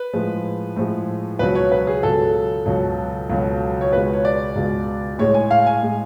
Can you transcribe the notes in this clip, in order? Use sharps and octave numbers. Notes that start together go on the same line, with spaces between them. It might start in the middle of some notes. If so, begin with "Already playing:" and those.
Already playing: B4
A2 F3 G#3
A2 F3 G#3
C#2 B2 F#3 B4
C#5
B4
G#4
C#2 B2 F#3 A4
C#2 B2 F#3
C#2 B2 F#3
C#5
C#2 B2 G#3 B4
C#5
D5
C#2 B2 G#3
A2 G#3 C#5
G#5
F5
G#5
A2 G#3